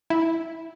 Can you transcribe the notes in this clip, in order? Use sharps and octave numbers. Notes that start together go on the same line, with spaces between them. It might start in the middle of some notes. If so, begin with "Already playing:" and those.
E4